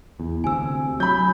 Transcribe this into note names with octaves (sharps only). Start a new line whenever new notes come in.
E2
D2 C3 G#5 E6
F#3 B5 G6